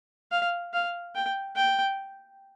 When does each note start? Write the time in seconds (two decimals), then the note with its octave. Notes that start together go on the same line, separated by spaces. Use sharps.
0.32 F5
0.74 F5
1.15 G5
1.56 G5